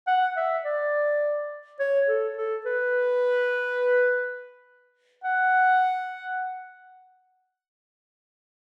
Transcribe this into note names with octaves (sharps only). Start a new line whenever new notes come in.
F#5
E5
D5
C#5
A4
A4
B4
F#5